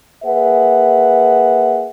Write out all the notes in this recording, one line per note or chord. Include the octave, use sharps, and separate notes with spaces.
A#3 G#4 B4 E5 F#5